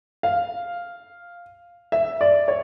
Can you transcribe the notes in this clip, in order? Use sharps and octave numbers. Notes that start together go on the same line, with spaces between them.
F5
E5
D5
C#5